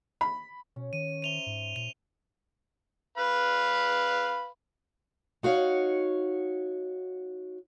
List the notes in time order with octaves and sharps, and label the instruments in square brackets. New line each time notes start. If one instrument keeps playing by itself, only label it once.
[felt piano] B5
[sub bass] B2 [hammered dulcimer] C#4
[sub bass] D#3 [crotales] D#7
[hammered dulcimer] C5 E5 A#5 [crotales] D#7 F7 G7
[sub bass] G#2
[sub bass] A#2 [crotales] F7
[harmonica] B4 F5 B5
[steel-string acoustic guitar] D#4 F#4 C#5 F5